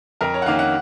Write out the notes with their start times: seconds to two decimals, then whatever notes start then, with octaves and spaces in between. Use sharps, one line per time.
0.21 F2 A#4
0.34 C#5
0.42 F#5
0.46 D#3 A#3 C#4 F5
0.59 F#5